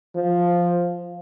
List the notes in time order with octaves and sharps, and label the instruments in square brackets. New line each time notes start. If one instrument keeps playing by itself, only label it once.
[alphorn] F3